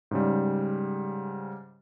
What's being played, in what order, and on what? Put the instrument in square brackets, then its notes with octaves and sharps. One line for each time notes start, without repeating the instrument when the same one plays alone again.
[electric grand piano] G#2 C#3 G3